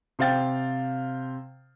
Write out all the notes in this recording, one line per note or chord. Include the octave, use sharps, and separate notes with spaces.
C3 C5 F5 G5 A6